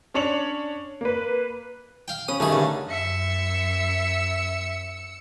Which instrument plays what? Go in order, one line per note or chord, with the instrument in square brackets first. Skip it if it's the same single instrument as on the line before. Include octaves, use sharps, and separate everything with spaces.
[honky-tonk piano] C#4 D4 C#5 C#7 F7 F#7
A#3 B4
[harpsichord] F5 G5
[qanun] C#4 B5 [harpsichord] D#6
[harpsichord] C#2 G2 G#4 [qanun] D#3 A3 D#4
[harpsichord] G2 [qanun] D3
[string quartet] F#2 [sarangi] E5 [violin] E6 C#7